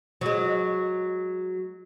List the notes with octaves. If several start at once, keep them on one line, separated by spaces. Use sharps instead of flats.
F#3 G#3